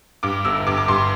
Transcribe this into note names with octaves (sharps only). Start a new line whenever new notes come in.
G2 D6
G1 E6
G2 D6
D6
G2 C6